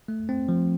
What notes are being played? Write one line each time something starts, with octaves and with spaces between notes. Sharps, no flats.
A3
C4
F3